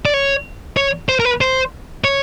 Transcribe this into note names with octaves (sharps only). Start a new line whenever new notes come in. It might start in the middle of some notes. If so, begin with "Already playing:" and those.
D5
C#5
C#5
C5
A#4
B4
C5
C#5